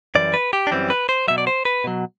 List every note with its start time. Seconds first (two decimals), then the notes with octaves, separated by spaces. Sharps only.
0.15 F#2 E3 G3 D5
0.34 B4
0.53 G4
0.67 D4
0.71 F#2 E3 G3 C4
0.90 B4
1.09 C5
1.28 B2 F#3 E5
1.38 D5
1.47 C5
1.65 B4
1.84 B2 F#3